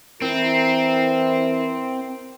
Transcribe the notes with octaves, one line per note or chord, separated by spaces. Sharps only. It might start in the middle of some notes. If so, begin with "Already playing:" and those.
E3 C4 E4 A#4